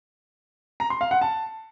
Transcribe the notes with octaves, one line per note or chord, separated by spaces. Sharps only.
A#5
C6
F5
F#5
A5